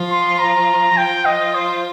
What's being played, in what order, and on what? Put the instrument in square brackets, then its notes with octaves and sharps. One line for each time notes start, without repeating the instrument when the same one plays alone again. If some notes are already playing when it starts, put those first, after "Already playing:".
Already playing: [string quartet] F3 F4
[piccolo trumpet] C6
A#5
[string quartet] F3 F4 [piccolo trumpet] G5
[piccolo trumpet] D#5
C5